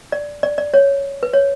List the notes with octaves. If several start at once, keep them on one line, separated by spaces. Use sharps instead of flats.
D5
D5
D5
C#5
B4
C#5